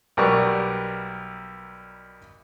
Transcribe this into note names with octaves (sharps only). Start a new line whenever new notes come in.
B1 G3 A#4 B4 D5 C#6